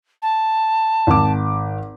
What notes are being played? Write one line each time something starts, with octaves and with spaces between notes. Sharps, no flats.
A5
G#1 D6